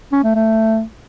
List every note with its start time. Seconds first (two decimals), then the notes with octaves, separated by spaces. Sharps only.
0.12 C#4
0.24 A3
0.35 A3